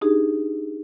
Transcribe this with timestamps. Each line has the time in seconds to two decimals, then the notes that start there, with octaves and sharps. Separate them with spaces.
0.01 D4 D#4 G4 G#4